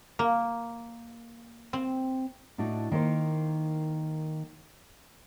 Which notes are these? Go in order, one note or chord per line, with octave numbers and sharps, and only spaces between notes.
A#3
C4
A2 D4 D#4 F#4
D#3 A#3 D#4 C5